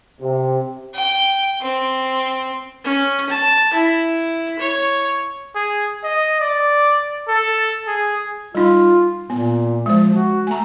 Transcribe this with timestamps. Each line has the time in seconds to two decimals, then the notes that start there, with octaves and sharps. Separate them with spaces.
0.21 C3
0.94 G5
1.61 C4
2.84 C#4
3.30 A5
3.73 E4
4.59 C#5
5.55 G#4
6.04 D#5
6.40 D5
7.28 A4
7.88 G#4
8.55 G3 D#4 F4
9.30 A#2 B3
9.86 F3 G#3 C5
10.14 F#4
10.47 A3 G#5 A#5